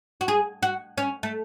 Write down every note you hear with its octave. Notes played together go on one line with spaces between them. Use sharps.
F#4
G#4
F#4
C#4
A3